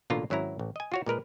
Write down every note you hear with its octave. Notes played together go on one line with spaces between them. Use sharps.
A1 B2 D3 A#3 F4 A#5
G#1 F#3 C#4 E4 A#5
A1
D#5 G#5
F4 F#4 C#5
A#2 G#3 A#4 B4